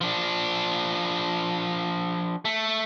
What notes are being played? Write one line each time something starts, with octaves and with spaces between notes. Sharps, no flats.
F3 D4
A3